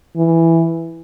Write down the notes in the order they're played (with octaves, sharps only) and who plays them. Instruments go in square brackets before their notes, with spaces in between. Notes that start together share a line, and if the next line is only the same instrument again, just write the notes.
[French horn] E3